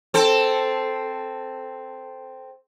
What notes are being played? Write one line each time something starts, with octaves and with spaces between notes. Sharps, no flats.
C4 A4